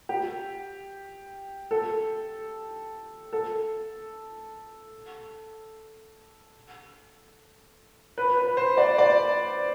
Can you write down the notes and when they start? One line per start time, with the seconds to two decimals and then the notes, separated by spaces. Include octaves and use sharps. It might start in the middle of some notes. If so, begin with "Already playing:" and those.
0.09 G4
1.71 A4
3.33 A4
8.18 B4
8.37 B4
8.57 C5
8.77 D5
8.98 D5